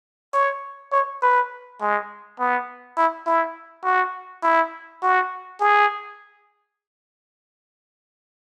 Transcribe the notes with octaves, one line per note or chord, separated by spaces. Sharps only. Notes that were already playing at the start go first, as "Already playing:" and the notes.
C#5
C#5
B4
G#3
B3
E4
E4
F#4
E4
F#4
G#4